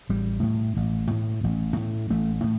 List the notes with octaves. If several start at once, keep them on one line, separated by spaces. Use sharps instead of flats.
A1 G3
A2
A1
A2
A1
A2
A1 A3
A2